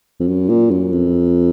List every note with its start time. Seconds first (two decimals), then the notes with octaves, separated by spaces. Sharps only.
0.20 F2
0.28 F#2
0.50 A#2
0.71 F#2
0.93 F2